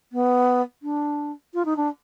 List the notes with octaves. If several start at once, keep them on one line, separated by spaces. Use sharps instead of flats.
B3
D4
F4
D#4
D4